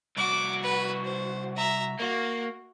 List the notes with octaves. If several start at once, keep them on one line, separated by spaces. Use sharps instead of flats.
C2 F#4 D6
B4
C5
E5 A#5
A#3 F#4